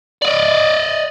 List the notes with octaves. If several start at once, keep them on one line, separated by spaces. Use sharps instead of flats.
D5 D#5